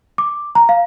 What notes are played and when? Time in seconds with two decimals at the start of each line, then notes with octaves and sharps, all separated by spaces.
0.18 D6
0.55 A#5
0.69 F5